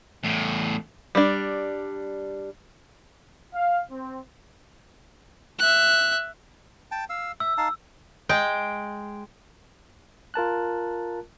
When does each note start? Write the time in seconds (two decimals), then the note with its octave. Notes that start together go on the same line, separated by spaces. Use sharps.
0.24 E2 A2
1.15 G3 D4
3.55 F5
3.90 C4
5.59 E5 F#6
6.91 G5 A5
7.10 F5 E6
7.40 E5 E6
7.58 D#4 F5 A5
8.29 G#3 G5
10.34 F4 A#4 A5 F#6